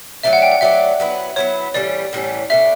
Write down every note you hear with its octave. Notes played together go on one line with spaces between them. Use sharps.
F#3 A3 D4 E5
F#5
G5
F#5
F#3 A3 D4 E5
F#3 B3 E4
F#3 B3 E4 C#5
A2 E3 G3 C#4 D5
A2 E3 G3 C#4
B2 A3 D4 E5